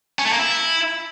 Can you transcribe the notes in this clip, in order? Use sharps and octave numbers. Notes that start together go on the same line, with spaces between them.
C#4
A3
A#3
E4